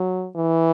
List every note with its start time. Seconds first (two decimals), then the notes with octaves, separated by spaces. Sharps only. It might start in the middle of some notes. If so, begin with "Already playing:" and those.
Already playing: F#3
0.36 E3